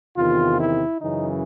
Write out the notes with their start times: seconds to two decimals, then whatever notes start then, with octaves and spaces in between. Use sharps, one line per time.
0.16 E2 C3 D#3 F4
0.59 E4
1.01 F#2 C#3 E3 D#4